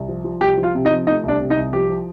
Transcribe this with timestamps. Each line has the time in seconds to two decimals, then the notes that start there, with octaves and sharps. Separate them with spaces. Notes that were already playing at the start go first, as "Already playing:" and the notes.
Already playing: C2
0.09 F3
0.24 F3
0.41 C2 G4 G5
0.57 F3
0.63 F4 F5
0.75 C3
0.85 D#4 D#5
0.90 F3
1.07 A3 D#4 D#5
1.23 C2 D4 D5
1.40 C3
1.50 D#4 D#5
1.57 C2
1.73 F3 G4
1.89 F3